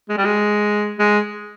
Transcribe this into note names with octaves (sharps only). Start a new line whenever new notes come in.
G#3
G3
G#3
G#3